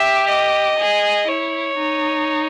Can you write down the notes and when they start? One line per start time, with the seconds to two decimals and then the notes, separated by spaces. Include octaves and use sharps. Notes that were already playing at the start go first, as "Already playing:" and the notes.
Already playing: G4 E5
0.27 D#5
0.78 G#4
1.28 E4 C#5
1.77 D#4